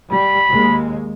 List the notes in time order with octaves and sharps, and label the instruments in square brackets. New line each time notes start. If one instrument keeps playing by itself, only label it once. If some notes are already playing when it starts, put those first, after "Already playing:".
[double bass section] G3 [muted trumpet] B5
[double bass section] D#2 G#3